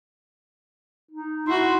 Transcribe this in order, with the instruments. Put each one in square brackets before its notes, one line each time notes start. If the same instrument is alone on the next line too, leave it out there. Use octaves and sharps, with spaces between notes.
[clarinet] D#4
[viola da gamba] E4 F#4 [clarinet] C6